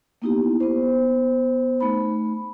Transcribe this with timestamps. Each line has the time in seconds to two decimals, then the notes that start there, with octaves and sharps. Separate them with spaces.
0.22 A#3 B3 D#4 E4 G4
0.60 B3 C5
1.81 A3 D#4 B5